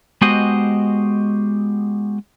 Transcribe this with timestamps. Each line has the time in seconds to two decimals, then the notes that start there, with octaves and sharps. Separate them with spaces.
0.22 G#3 B3 F#4 G4 C5 D#5